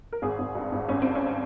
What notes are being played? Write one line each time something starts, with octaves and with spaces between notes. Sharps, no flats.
A#4
G#1 G#4
G#1
G2
G#1
G#1 C#4
G2 C4
C#4